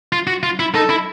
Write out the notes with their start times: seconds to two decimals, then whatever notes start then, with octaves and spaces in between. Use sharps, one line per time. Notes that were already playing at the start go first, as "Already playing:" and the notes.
0.12 F4
0.27 F#4
0.43 F4
0.59 E4
0.75 D#4 A4
0.90 E4